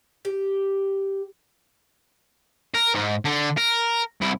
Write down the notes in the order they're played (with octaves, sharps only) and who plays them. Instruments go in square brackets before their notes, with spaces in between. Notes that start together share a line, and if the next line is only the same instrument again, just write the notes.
[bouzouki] G4
[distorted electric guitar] A#4
G#2
D3
A#4
C2 E4